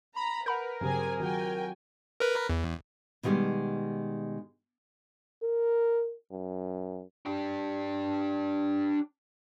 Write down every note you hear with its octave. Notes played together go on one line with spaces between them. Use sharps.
A#5 B5
A#4 B4 F#5 B5 G6
G2 C#3 F#3 C4 G4 G#4 C5 G#5
D#3 F#3 F4 F#4 G5 G#5
A#4 B4
E2
B2 D#3 F3 G3 G#3
A#4
F#2
D4 G4